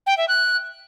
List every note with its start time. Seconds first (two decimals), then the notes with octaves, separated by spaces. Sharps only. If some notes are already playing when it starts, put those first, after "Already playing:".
0.07 G5
0.18 E5
0.28 F#6